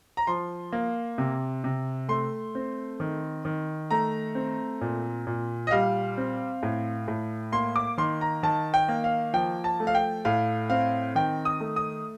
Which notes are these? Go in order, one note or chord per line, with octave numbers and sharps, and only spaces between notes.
A#5
F3 C6
A#3
C3
C3
A3 C6
C4
D#3
D#3
A3 A#5
C4
A#2
A#2
D#5
G3 F5
C4
A2
A2
A#3 C6
D6
D#3 C6
A#5
D#3 A5
G5
A#3
F5
F3 G5
A5
A3
F5
G5
A2 F5
C4 F5
D#3 G5
D#6
A3
D#6